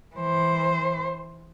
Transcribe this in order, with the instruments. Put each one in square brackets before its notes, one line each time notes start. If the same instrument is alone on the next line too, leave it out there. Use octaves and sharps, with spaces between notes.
[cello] E3 C5